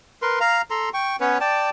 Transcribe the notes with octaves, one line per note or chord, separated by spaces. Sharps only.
A#4 B4 C6
F5 A#5
A4 A#5 C6
G5 C#6
B3 C#4 B4 C#5
D5 G5 A5